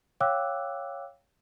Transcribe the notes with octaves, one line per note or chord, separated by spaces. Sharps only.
C#5 F5 G5 D6 E6 F#6